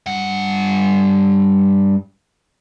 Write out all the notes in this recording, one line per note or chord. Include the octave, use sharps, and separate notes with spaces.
G2 F#5